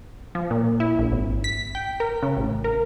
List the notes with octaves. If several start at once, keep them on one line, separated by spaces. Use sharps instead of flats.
F3
A#2
E4
A#1
G#1
B6
G5
A#4
C#3
A1
A#4